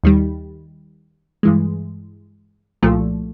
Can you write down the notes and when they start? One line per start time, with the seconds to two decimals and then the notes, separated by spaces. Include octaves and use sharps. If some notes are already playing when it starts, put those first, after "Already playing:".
0.04 D#2 D#3 G3
1.43 G2 E3 G#3
2.82 C2 A#2 F3 A3